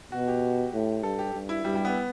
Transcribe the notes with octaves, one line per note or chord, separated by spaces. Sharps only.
B2 F#4
G4
A2
G2 A4
G4
G2
E4
G2 G3
G3
B3